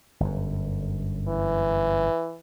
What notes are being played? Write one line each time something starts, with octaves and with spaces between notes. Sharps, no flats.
G1 F#2
E3